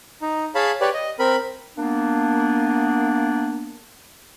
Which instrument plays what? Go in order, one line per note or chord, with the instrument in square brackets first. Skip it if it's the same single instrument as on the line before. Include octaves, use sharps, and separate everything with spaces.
[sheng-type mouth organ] D#4
G#4 C#5 F5 A5 B5
G4 B4 C#5 D5
D#5
C4 A#4 B5
[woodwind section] A#3 B3 D4